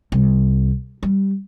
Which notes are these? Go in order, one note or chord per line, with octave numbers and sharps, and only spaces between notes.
C2
G3